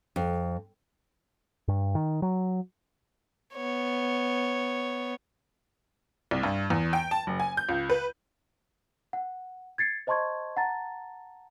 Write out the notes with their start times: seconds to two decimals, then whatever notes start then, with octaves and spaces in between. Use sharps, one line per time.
0.16 F2
1.68 G2
1.95 D#3
2.22 F#3
3.55 B3 C#5
6.31 C2
6.43 G2
6.70 E2
6.93 G5
7.11 A5
7.27 F#1
7.40 G#5
7.57 G6
7.69 C#2
7.90 B4
9.13 F#5
9.78 G#6 A6 C7 C#7
10.07 C5 D#5 A5 C6 C#6 G#6
10.57 F#5 A5 A#5 A6